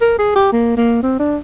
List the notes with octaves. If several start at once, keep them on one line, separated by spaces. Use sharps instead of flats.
A#4
G#4
G4
A#3
A#3
C4
D4